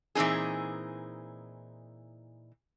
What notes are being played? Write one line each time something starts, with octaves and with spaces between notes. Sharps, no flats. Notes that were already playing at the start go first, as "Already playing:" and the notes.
A#2 E3 C4 D#4 G#4